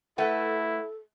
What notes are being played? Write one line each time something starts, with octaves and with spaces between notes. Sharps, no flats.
A3 E4 A4 B4 F#5